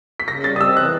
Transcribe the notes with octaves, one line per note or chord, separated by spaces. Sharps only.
B6
C#3 A#6
G3 A6
D#6
C4 E6
E3 F#6